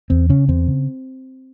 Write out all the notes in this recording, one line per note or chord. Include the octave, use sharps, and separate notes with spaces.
E2 C4
C#3 C#4
E2 C4
C#3